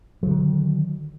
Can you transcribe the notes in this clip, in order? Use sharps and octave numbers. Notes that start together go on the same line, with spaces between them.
D3 D#3 F#3